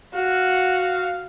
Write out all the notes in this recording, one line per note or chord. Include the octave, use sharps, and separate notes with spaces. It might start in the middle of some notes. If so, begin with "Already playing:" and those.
F#4 F5